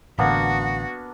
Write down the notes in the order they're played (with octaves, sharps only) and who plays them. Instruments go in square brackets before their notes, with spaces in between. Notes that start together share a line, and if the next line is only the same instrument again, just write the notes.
[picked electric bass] A1 D3 [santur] A#3 B3 D4 [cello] F#4 [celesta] F5 F#5